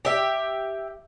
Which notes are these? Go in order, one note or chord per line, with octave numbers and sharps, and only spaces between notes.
G4 E5